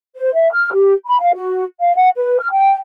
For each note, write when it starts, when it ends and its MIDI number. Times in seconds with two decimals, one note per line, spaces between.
0.16 0.32 72
0.34 0.52 76
0.53 0.73 89
0.73 0.93 67
1.07 1.19 83
1.19 1.31 77
1.34 1.63 66
1.80 1.95 77
1.96 2.08 78
2.16 2.38 71
2.39 2.51 89
2.51 2.76 79